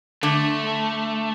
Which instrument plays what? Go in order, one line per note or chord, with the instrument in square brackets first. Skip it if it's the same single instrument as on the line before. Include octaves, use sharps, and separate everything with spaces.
[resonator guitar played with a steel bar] D3 [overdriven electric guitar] A3